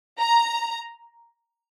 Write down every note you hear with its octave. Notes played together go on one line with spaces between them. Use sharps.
A#5